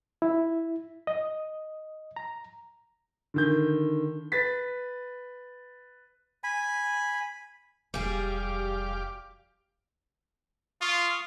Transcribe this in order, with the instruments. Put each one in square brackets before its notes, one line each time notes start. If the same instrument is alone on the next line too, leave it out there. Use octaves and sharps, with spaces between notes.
[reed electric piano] E4
D#5
A#5
[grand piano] D3 D#3 G6
B4 A6 B6
[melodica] G#5 B5
[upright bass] E1 F2 [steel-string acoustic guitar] G3 G#4 [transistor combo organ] G4 F5 D6
[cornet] F4 [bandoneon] F5 C#6 D#6